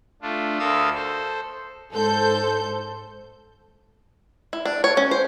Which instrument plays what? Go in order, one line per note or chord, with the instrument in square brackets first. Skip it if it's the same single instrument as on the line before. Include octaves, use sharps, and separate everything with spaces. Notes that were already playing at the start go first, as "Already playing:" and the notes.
[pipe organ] A3 D4 F4
D2 A4 A#4 F5 D#6 E6
A4 C5
[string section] G#2 A4 C5 G6
[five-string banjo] E4
D4
C#5
C#4
C5